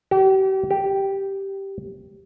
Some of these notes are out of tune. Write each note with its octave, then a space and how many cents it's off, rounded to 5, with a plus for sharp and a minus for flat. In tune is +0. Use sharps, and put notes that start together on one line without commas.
G4 -40
G4 -5